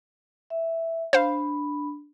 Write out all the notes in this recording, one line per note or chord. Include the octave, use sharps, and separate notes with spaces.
E5
D4 C5 F5 B5